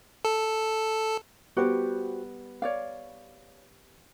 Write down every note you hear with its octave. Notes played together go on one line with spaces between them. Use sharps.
A4
G3 B3 F#4 G4 C5
C#5 D5 F5